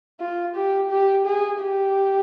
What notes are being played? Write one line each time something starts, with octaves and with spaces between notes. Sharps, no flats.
F4
G4
G4
G#4
G4